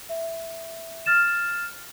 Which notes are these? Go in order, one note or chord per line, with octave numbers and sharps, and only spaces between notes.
E5
F6 A6 E7